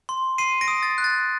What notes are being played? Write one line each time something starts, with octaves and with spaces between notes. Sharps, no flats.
C6
C6 C7 D#7
A#6 D7
D#6
A6
F#6
A6